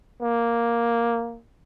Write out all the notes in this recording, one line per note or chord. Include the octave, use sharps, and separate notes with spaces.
A#3